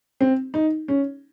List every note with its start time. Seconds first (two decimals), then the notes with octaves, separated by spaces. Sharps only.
0.21 C4
0.54 D#4
0.88 C#4